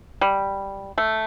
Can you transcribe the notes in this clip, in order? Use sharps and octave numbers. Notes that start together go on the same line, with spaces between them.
G3
A3